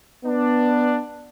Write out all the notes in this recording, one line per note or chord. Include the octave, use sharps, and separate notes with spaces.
B3 D4